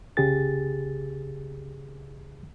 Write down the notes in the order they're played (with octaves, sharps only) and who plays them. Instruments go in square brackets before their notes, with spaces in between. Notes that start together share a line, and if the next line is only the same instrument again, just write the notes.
[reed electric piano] C2 C#3 G4 G#4 A6